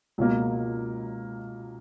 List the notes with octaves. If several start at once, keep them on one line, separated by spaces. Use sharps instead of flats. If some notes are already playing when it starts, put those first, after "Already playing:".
C#2 B2 A#3